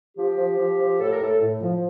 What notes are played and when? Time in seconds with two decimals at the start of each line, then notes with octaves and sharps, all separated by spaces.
0.17 F3 G4
0.38 F3
0.58 F3
0.79 F3
1.00 A2 A4
1.12 A#4
1.21 A2 A4
1.41 A2
1.62 F3